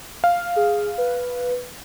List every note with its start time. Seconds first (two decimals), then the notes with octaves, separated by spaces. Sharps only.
0.24 F5
0.56 G#4
0.98 B4